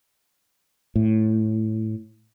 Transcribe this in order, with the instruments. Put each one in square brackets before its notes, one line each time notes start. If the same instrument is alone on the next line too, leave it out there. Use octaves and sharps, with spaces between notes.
[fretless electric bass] A2